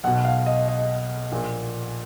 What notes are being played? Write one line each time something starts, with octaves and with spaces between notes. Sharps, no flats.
B1 B2 F#5
F5
D#5
D#5
A#1 A#2